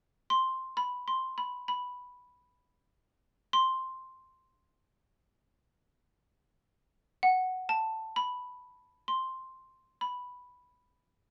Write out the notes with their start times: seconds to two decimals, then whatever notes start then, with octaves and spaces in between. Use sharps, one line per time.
0.30 C6
0.77 B5
1.08 C6
1.38 B5
1.68 B5
3.53 C6
7.23 F#5
7.69 A5
8.16 B5
9.08 C6
10.01 B5